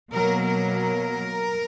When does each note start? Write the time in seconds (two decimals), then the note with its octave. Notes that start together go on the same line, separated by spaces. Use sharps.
0.12 B2 F#3 A#3 A#4
0.46 A#4